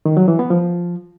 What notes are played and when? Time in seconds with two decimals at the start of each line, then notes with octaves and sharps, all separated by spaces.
0.05 D#3
0.17 F#3
0.28 E3
0.39 B3
0.50 F3